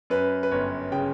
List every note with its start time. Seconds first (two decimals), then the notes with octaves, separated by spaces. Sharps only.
0.10 F#2 B4
0.43 B4
0.51 G1 C#5
0.92 C#3 G5